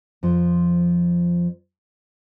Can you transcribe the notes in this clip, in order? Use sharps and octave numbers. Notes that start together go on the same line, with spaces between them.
F2 F3